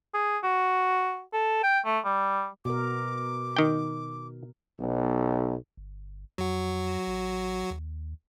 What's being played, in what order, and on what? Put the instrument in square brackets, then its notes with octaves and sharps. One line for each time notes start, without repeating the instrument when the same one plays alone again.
[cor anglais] G#4
F#4
A4
G5
A3
G3
[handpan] B2 A#4 [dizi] D6
[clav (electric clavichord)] D#3 G5
[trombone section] B1
[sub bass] G1
[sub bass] F2 [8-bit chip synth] F#3 F#4
[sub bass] A1
D#2